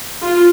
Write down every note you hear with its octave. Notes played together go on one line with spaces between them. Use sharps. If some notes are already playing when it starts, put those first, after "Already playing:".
F4